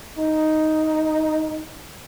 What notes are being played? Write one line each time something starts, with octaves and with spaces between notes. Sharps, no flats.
D#4